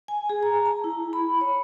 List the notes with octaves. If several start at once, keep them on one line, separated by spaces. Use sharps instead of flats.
G#5
G#4
A#5
A5
E4
B5
C#5